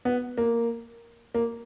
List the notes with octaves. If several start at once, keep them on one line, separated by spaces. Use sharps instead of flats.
B3
A#3
A#3